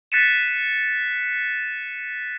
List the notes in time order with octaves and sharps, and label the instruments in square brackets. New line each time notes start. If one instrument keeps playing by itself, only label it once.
[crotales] F#6 A6 B6 C#7 D#7 E7